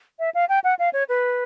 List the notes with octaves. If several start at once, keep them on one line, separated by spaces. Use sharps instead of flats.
E5
F5
G5
F#5
F5
C#5
B4